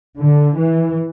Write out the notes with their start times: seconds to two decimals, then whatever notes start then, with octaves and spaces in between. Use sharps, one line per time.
0.20 D3
0.58 E3